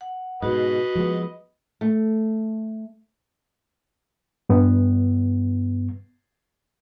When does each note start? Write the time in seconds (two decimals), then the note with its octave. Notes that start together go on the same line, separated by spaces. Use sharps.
0.01 F#5
0.42 G#2 B2 F#4 B4 D#5
0.95 F3 G#3 B3
1.81 A3
4.49 G2 B3